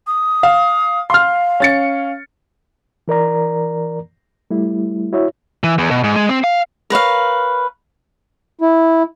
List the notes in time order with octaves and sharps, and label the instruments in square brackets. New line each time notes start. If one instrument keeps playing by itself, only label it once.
[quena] D#6
[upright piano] F5
[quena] F5 [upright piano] C6 F6
[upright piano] C#4 A6 C#7
[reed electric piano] E3 A#4 D5 A#5
G3 A3 E4
E4 F#4 C#5 E5
[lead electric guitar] E3
E2
B2
G#2
G#3
C4
F5
[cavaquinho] A#4 B4 C#5 F5
[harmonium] E4